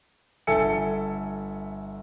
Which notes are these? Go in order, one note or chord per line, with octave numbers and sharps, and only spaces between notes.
G1 A4 E5 G#5 C#7